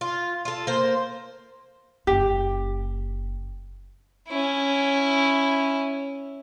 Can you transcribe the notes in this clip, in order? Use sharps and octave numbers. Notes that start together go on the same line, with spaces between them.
F4
F4 A4
A#3 C5
F#1 C#4 G4
C#4 E4